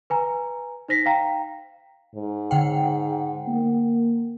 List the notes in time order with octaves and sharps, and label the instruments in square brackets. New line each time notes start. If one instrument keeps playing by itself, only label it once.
[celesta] B4 G#5 A#5
D#4 C5 A#6 B6
F5 G5 A#5
[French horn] G#2
[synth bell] D3 F#5 G5
[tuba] A#3